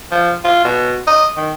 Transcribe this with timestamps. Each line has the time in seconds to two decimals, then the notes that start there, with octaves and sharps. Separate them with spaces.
0.12 F3
0.45 F4
0.65 B2
1.07 D#5
1.37 D#3